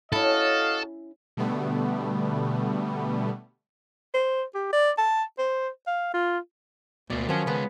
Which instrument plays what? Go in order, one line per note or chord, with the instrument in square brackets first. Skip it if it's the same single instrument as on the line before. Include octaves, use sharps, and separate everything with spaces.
[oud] C#4 E4 [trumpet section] F#4 D#5 F5 [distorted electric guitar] A4
[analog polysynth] B2 D3 G3 A3 B3
[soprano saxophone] C5
G4
D5
A5
C5
F5
F4
[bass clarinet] D2 [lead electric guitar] B2 A#3 [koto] D5
[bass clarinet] D#3 [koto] F3 C#4 [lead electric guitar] F#3
[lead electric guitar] C#3 G#3 [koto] B3 B4